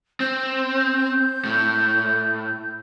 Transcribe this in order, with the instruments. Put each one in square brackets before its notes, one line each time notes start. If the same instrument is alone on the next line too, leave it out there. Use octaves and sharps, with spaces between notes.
[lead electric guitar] C4 [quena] G6
[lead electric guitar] A2